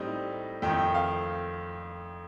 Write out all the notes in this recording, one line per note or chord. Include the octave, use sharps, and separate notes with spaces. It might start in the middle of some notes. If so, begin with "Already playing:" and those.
Already playing: A2 G3 C4 D#4 D#5
F2 D#3 A3 G5
G5
F5